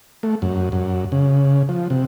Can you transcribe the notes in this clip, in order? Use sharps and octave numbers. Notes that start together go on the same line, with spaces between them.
A3
F#2
F#2
C#3
F3
C3